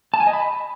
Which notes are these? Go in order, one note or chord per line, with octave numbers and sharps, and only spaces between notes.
A5
G#5
D#5
B5